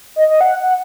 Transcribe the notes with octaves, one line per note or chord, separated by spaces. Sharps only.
D#5
D#5
F#5
F#5